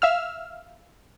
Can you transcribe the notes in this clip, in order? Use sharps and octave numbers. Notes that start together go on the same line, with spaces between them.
E5 F5 E6 F6